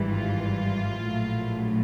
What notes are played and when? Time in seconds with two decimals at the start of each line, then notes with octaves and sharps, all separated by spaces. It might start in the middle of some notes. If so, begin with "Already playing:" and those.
Already playing: G#1 G2 E3 G3
0.10 F4
1.03 A#1 A2 F#3 A3